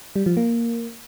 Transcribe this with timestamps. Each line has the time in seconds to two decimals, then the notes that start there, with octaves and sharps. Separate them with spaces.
0.16 G3
0.26 F3
0.37 A#3